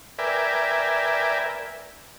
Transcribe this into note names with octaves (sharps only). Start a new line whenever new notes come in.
A#4 B4 D5 E5 G5 G#5